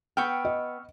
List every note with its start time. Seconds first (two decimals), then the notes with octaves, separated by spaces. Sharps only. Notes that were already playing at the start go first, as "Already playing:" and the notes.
0.17 B3 G5 C#6 E6 F6
0.45 D#5